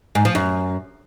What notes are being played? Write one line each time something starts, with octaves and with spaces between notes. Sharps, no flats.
G#2
F3
F#2